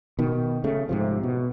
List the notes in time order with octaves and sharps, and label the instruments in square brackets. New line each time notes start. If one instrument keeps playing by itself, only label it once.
[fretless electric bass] B2 D#3
C#3 A3
G#2 C3 F3
B2